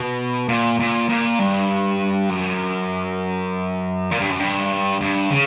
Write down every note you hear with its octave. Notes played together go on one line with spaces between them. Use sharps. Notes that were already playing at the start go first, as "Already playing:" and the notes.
Already playing: B2
A#2
A#2
A#2
G2
F#2
A#2
G2
F#2
G2
G2
C#3